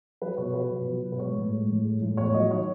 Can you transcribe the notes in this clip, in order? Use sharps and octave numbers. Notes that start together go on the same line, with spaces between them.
F#3 B4
B2 C#5
F#3 B4
B2
F#3
B2
B4
G#3 C#5
A2
G#3
A2
G#3
A2
E2 C#5
C#5
F#3 D#5
D#3 C#5